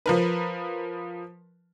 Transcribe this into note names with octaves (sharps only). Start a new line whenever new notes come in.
F3 A#4 B4